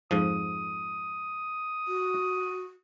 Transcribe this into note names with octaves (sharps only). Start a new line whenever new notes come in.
F2 G#2 F3 D#6
F#4